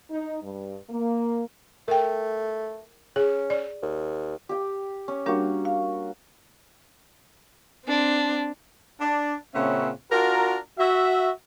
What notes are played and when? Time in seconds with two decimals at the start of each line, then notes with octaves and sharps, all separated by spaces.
0.10 D#4
0.42 G2
0.89 A#3
1.88 A3 A#4 G5
3.16 C#4 G#4
3.50 D5
3.82 D#2
4.49 G4 G5
5.08 C#4
5.26 G3 A#3 D4 F#4 G4
5.65 F5
7.86 C4 D4
9.01 D4
9.55 A#2 C#3 C4 C#4 E5 F#5
10.12 D4 F4 F#4 A#4
10.79 F#4 E5